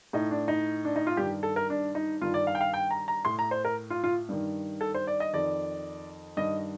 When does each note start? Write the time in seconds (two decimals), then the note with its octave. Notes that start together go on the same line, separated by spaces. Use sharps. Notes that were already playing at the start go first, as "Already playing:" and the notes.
0.13 A2 D#4
0.31 D4
0.48 D#4
0.85 D4
0.96 D#4
1.07 F4
1.17 G2 D#3 G4
1.43 A4
1.56 A#4
1.70 D4
1.95 D#4
2.21 G2 D#3 F4
2.34 D5
2.47 F5
2.55 G5
2.61 F5
2.74 G5
2.91 A#5
3.08 A#5
3.25 A2 C6
3.39 A#5
3.51 C5
3.65 A#4
3.90 F4
4.04 F4
4.29 G2 D#3
4.81 A4
4.94 C5
5.07 D5
5.20 D#5
5.33 F2 D#3 D5
6.37 G2 D#3 D#5